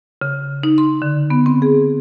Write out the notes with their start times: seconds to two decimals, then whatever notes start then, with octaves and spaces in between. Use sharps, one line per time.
0.21 C#3
0.63 D#4
0.78 C6
1.02 D3
1.30 B3
1.46 C4
1.62 G#4